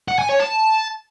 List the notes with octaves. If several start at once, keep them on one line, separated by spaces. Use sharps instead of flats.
F#5
G#5
C#5
A5